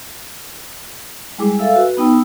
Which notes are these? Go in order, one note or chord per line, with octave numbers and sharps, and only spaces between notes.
G3 G#3 E4 G#4 D6
A4 E5 F5 G#5 E6
F#4 B4
B3 D#4 G5 E6